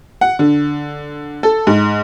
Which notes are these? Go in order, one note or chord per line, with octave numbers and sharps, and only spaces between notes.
F#5
D3
A4
G#2